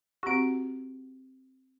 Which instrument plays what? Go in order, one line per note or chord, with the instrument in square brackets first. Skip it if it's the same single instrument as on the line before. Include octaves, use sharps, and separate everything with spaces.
[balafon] C4 G4 [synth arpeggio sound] F#4 D7